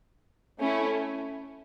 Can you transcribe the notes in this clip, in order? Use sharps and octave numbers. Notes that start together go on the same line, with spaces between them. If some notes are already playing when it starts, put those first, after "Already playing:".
A3 C#4 E4